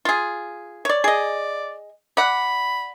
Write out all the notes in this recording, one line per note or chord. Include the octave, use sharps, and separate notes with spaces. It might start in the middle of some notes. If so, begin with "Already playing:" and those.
F4 G#4
C#5 D5
G#4 D5 D#5
D5 F#5 B5